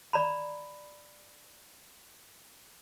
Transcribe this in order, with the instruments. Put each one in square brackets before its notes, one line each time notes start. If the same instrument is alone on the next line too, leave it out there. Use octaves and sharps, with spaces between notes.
[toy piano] D5 A#5 B5